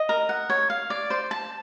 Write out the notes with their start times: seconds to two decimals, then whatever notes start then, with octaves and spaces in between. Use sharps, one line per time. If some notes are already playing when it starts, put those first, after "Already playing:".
Already playing: D#5
0.09 A#4
0.29 F#5
0.50 C#5
0.70 F5
0.90 D5
1.10 C5
1.31 A5